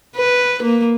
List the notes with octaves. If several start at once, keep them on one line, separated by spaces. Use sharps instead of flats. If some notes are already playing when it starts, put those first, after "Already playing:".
B4
A#3